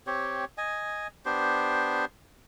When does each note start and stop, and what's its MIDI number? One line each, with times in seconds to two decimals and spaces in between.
0.07 0.45 60
0.07 0.45 67
0.07 0.45 73
0.58 1.07 75
0.58 1.07 80
1.25 2.05 59
1.25 2.05 62
1.25 2.05 67
1.25 2.05 72